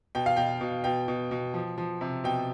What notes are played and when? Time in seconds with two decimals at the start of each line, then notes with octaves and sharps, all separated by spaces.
0.15 B2 G5
0.26 F5
0.37 B2 G5
0.61 B2
0.84 B2 G5
1.08 B2
1.31 B2
1.54 F3
1.78 F3
2.01 C3
2.24 B2 G5